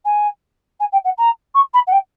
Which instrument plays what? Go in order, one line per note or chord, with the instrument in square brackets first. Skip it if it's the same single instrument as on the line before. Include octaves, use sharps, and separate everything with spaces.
[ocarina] G#5
G#5
G5
F#5
A#5
C#6
B5
F#5
G5